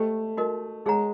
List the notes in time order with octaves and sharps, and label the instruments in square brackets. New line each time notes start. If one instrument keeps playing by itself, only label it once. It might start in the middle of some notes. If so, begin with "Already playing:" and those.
Already playing: [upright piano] A3 [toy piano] G4 C5 D#5 G5
[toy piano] D#4 F#4 A#4 D#5
[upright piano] G#3 [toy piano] D#4 G#4 C#5 F#5 A#5